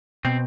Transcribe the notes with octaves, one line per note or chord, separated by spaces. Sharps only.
B2 C4